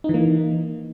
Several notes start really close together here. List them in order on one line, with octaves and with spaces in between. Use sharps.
D#4 E3 A#3